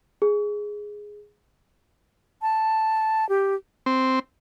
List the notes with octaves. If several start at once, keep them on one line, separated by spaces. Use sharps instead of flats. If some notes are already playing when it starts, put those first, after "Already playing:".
G#4
A5
G4
C4